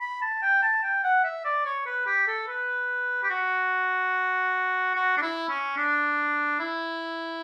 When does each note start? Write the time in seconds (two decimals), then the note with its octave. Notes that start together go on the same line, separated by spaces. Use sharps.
0.01 B5
0.22 A5
0.42 G5
0.63 A5
0.83 G5
1.04 F#5
1.24 E5
1.45 D5
1.65 C#5
1.86 B4
2.06 G4
2.27 A4
2.48 B4
3.23 G4
3.30 F#4
4.95 F#4
5.17 D4
5.22 E4
5.49 C#4
5.77 D4
6.59 E4